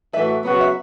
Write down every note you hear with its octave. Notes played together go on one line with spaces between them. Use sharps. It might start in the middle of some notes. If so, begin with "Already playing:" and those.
A2 E3 A3 F#4 B4 E5
C#3 F#3 B3 F#4
E5